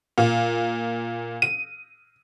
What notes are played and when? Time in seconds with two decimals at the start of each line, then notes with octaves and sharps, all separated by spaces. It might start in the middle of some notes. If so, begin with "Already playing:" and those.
0.18 A#2
1.42 D#7